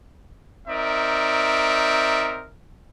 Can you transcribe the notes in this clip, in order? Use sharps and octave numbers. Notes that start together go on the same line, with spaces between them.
C4 D#4 A#4 D5 E5